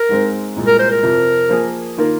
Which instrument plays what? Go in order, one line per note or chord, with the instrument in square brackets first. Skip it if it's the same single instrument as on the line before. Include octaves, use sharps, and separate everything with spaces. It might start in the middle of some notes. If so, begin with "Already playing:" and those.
Already playing: [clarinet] A#4
[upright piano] G#2 G#3 C4
C2 A#2 G#3
[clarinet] A#4
C5
A#4
[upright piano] F2 C3 F3
F3 A#3 G#4
D#3 A#3 F4 A#4